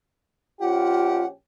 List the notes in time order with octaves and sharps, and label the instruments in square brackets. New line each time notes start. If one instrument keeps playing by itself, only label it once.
[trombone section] A#1 C#4 G4 [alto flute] F4 [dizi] F#5